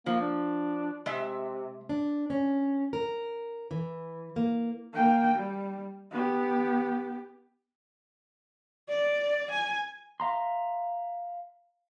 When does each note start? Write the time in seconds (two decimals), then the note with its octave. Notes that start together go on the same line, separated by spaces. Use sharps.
0.06 F3 A#3
0.21 D4
1.06 C3 G#3 E5
1.89 D4
2.30 C#4
2.93 A#4
3.71 E3
4.36 A#3
4.93 A#3 G5
5.35 G3
6.11 B3 G4
8.88 D5
9.50 G#5
10.20 E5 F5 A#5 C6